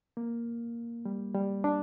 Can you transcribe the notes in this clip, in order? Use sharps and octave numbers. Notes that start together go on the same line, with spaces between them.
A#3
G3
G3
D4